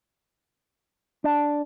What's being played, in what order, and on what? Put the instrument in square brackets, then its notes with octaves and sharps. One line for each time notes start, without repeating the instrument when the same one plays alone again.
[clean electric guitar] D4